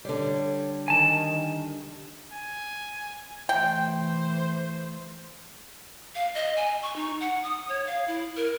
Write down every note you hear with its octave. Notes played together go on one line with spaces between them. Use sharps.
D3 G3 C#5
D#3 G#5 A5
G#5
E3 A3 C5 G5
F5
D#5
G#5
C#6
D#4
F#5
D#6
C#5
F5
E4
A#4